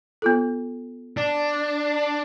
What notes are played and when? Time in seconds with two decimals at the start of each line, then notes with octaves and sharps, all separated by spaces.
0.22 B3 F4 A4
1.17 D4